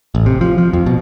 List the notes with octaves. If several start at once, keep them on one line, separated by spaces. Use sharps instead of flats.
A1
C3
F3
F3
F2
B2